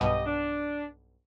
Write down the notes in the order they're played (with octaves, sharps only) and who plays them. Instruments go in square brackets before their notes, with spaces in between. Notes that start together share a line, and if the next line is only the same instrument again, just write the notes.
[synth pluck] B1 G2 B2 [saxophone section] G4 D#5
[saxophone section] D4